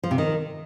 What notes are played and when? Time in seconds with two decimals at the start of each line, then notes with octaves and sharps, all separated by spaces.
0.03 F3
0.11 C3
0.18 D#3